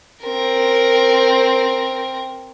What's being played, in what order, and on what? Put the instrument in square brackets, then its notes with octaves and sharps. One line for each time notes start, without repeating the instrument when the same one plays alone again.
[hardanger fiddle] C4 A#4